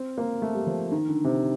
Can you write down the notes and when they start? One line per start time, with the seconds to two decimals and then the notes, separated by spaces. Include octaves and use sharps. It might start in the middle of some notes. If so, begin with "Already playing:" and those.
Already playing: C4
0.18 A#3
0.42 A3
0.54 G3
0.67 F3
0.92 D#3
1.08 D3
1.24 C3